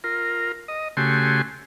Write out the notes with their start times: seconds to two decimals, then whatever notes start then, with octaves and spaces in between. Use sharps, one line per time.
0.04 F4 A#4
0.68 D#5
0.97 C#3 A3 F#4 G4 G#5 C6